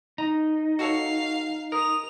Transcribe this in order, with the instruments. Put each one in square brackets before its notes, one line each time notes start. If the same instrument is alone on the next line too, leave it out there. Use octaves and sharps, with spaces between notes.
[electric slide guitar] D#4 [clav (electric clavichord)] A#5
[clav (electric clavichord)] F#4 A4 C#5 [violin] F5
[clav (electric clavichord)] A#4 [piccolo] D#6 [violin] F7